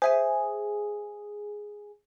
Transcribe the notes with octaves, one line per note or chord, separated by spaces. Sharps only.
G#4 C5 E5 G#5